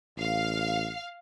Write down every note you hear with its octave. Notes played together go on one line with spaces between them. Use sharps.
A1 F5